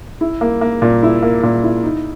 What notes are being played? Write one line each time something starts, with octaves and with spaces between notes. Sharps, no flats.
E4
A#3
A#3
A#2
E4
A#3
A#2
E4
D#4